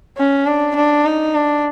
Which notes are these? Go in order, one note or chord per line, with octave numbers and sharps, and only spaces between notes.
C#4
D4
D4
D#4
D4